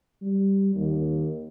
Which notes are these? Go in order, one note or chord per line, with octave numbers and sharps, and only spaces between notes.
G3
D#2